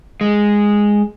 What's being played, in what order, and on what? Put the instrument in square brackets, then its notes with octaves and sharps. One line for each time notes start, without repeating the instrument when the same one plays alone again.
[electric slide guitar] G#3